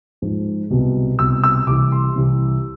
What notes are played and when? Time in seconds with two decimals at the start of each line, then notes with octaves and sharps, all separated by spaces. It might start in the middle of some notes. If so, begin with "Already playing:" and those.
0.22 G#2 F3
0.70 C2 B2
1.19 C2 B2 E6
1.44 E6
1.67 C2 C3 E3 D6
1.92 C6
2.16 C2 C3 E3